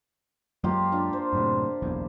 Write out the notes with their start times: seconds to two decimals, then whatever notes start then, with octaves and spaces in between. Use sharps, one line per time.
0.64 F#2 F#3 G#3 A#3 F4 G4
0.92 D4 F4
1.13 C5
1.33 F#2 A2 C3
1.82 F#1 B1 E2